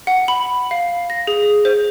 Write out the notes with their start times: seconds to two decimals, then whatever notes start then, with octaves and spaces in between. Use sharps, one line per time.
0.07 F#5
0.28 B5
0.71 F5
1.10 A#6
1.27 G#4
1.65 C5